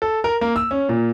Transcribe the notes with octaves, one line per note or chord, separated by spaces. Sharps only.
A4
A#4
A#3
E6
C#4
A#2